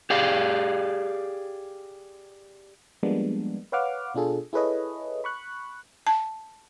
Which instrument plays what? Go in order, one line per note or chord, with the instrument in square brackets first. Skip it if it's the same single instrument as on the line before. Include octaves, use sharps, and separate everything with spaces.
[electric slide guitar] G4 G#4 D5 F5
[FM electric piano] F3 G3 G#3 A#3 B3 D4
B4 C#5 F5 F#5 D6 F6
B2 D4 F4 G#4 A4
E4 G#4 A4 B4 C#5 D#5
B5 C#6 F#6
[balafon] A5